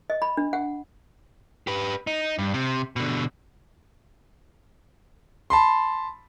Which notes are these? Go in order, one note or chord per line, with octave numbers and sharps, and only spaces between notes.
D#5
B5
D4
F#5
G4 B4
D#4
G2
C3
B2 D3
A5 B5 C6